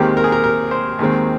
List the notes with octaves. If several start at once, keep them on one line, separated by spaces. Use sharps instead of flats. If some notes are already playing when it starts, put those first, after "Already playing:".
Already playing: D#2 D#3 G#3 C4 G4
A#4
G#4
A#4
A#4
C5
D#2 D#3 G#3 C4